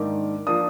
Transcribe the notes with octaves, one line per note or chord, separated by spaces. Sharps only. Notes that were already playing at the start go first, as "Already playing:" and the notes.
Already playing: G#2 D#3 A#3 D4 D6
F3 A#3 D4 D#6